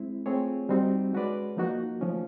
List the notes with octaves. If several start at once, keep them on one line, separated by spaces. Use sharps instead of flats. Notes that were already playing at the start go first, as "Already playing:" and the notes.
Already playing: G#3 C4 E4
A3 C4 F4 G#4 C#5
G3 C4 D#4 F#4
G#3 C#4 F#4 B4 D5
F3 A#3 D#4 F#4
F3 A3 C#4